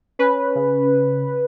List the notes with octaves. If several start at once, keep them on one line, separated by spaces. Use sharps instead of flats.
C#4 B4
C#3